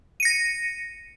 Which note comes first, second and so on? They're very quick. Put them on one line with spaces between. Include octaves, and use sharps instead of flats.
D#7 C#7 A#6